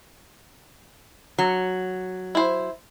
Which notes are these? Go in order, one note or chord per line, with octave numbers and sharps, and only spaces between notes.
F#3
E4 C5